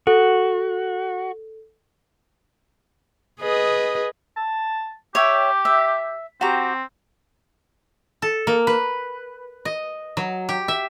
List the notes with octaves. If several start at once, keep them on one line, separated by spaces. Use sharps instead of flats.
F#4 A4
G#4 B4 D#5
A5
G4 C#5 E5 G5
E5
C4 F#4 G4 A#5
A4
A#3
B4
D#5
F#3
G4
E5